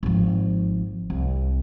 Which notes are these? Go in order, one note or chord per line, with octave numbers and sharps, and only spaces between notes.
G#1 F3
C2